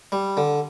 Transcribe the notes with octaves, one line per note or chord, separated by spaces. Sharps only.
G3
D3